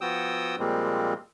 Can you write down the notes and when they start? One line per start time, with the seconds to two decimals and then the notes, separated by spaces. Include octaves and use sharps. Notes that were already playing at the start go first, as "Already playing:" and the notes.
0.01 F3 B3 F#4 G5 D#6 E6
0.59 A#2 F3 G3 G#3 A#3 C4